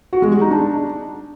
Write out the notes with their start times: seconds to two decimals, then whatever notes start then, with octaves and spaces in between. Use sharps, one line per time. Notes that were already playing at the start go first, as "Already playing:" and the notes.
0.13 F#4
0.22 G#3
0.32 G3
0.41 D#4
0.51 D4